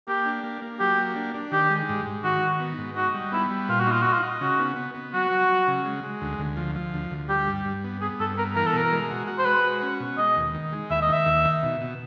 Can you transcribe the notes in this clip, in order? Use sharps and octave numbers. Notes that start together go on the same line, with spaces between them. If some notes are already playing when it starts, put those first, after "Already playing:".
A#3 G4
D4
A#3
A#3
F#3 G4
A#3
D4
D4
D#3 G4
G#3
G#2
G#2
D#3 F#4
D#3
B3
G#2
D#4 F#4
G3
B3 E4
G3
A#2 F4
F#4
D#4
F4
D#4 F#4
F4
D#4
C#3 F#4
B3
B3
B3
F#3 F#4
F#3
F#3
C#3
G#3
G#3
D2
D2
F3
F3
D2
D2
G3 G4
G2
G2
B3
B3 G#4
G2 A4
B3 A#4
E3 A#4
A4
B2 A#4
G#3
F#4
F#4
C5
G#3 B4
F#4
C#4
B2
G#3 D#5
D#2
D#3
G#3
D#2 E5
D#5
D#3 E5
D#2
D#3
B2
B2